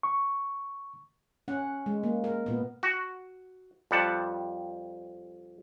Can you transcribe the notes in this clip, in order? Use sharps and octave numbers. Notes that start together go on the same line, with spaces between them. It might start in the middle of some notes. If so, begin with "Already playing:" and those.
C#6
C#4 F#5
G#3
A#3
A#4
A#2 B3
F#4
F2 G3 F#5 A5